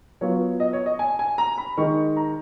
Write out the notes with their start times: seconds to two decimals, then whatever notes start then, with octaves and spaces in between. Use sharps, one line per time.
0.21 F#3 B3 F4 C#5
0.60 D#5
0.73 C#5
0.86 D#5
0.99 G#5
1.19 G#5
1.38 A#5
1.58 B5
1.77 D#3 G#3 D#4 C#6
2.17 A#5